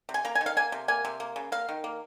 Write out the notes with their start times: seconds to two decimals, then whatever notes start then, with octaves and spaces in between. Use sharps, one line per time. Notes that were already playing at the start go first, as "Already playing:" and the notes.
0.09 C3
0.14 G#5
0.25 A#3 A#5
0.35 G#5
0.41 D#3
0.46 F5
0.57 A#3 G#5
0.72 C3
0.88 A#3 G#5
1.05 C3
1.20 A#3
1.36 C#3
1.52 A#3 F5
1.69 D#3
1.84 A#3